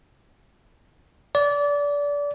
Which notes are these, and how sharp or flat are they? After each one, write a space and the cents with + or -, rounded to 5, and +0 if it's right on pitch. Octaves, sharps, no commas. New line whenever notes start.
D5 -25